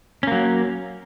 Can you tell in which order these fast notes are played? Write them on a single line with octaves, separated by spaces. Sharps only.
C#4 A#3 F#3